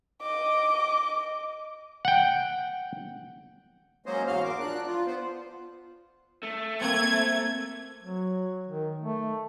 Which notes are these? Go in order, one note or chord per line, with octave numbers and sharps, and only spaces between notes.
D#5 D6
F#5 G5
F#3 G#3 A#3 C#4 C5 D#5
E2 G#2 F#4 F5 F6
A#4 D6
F3 D4 F#6
F4
B3 C5
A3
A#3 C4 G#6
F#3
D#3
A3